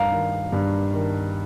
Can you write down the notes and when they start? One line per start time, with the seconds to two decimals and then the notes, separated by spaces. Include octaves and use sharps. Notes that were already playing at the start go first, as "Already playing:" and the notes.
Already playing: G2 G3 F5 A#5
0.12 D#3
0.52 G2
0.93 D#3